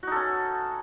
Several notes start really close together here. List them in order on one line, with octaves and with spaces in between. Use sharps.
F#4 D#4 A4 C#4